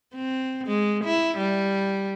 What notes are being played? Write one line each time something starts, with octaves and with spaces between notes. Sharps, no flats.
C4
G#3
E4
G3